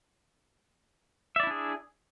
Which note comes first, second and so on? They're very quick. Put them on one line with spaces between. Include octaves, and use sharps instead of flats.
E5 D5 E4 D4 G#4